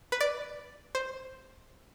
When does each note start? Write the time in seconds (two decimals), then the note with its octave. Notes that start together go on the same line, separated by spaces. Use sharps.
0.12 B4
0.20 D5
0.95 C5